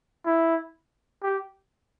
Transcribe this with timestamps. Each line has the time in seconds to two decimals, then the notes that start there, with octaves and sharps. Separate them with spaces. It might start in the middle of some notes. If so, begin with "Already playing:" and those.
0.26 E4
1.23 G4